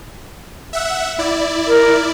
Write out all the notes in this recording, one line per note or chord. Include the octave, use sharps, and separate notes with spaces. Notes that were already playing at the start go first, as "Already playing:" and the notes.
E5 F#5
E4 D5
A#4